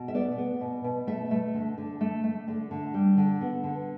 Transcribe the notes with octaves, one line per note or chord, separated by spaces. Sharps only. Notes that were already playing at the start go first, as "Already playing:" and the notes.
Already playing: B2
E5
B3 D5
B3
B2
B2
A3 E5
A3
D3
D3
A3
A3
D3
D3
G3
D3
B3
D3